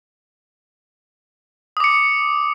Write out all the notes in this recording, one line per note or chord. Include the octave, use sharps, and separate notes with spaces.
D6 D#6 C#7